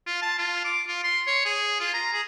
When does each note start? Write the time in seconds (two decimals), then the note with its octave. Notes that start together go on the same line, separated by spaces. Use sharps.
0.07 F4
0.22 A5
0.38 F4
0.64 D6
0.88 F4
1.04 C6
1.27 C#5
1.45 G#4
1.80 F4
1.93 A#5
2.13 G#4